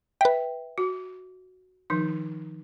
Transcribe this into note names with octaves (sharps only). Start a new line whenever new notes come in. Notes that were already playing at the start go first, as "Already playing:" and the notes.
B4 E5 G5
F#4
D#3 F3 D#4